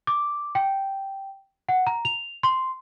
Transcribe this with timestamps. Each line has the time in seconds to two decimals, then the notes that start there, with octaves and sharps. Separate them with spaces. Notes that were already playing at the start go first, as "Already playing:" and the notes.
0.07 D6
0.55 G5
1.69 F#5
1.87 A#5
2.05 F7
2.43 C6